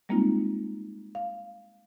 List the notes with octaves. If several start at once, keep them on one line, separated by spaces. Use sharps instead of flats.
G3 G#3 A#3 C4 D#4 F4
F5